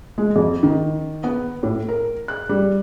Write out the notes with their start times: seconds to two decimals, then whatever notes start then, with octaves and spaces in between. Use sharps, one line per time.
0.18 G#3
0.36 F2
0.63 D#3
1.24 B3
1.63 A2
1.89 A#4
2.28 F#6
2.49 G3